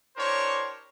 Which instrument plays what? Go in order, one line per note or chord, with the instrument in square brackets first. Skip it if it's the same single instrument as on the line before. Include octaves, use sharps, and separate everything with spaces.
[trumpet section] D4 E4 G4 A#4 C5 C#5